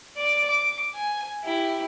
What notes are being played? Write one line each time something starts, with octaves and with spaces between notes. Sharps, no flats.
D5 D6
D6
G#5
E4 G4